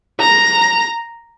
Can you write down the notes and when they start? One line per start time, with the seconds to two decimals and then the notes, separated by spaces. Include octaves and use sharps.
0.20 A#5